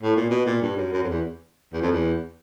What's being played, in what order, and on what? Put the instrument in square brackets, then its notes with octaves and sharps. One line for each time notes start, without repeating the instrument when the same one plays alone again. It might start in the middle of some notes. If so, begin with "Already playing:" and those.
[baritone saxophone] A2
A#2
B2
A#2
G2
F#2
F#2
F2
E2
E2
F2
E2